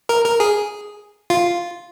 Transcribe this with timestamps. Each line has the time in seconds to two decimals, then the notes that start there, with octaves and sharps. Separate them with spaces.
0.09 A#4
0.25 A#4
0.40 G#4
1.30 F4